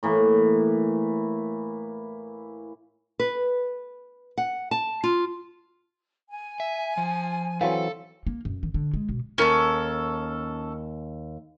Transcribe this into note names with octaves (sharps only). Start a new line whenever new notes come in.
A2 E3 A#3
B4
F#5
A5
F4
G#5
E5
F3
E3 F#3 C4 A4 F5
A#3
F#2
D#3
D3
G#3
B2
D#2 C#4 A4 A#4